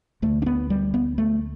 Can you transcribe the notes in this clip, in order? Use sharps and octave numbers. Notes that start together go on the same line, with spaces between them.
D2 D3 A3
D4
B3
G3
B3
A3